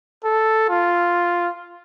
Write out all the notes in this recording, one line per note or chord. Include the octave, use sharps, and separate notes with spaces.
A4
F4